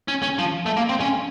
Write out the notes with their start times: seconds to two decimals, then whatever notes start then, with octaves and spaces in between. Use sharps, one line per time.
0.08 C#4
0.22 C#4
0.39 F3
0.66 A3
0.77 A#3
0.89 C4
1.00 C#4